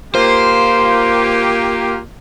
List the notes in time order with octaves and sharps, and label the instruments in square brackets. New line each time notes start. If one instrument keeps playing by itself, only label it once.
[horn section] A#3 F4 G4 [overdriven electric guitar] C5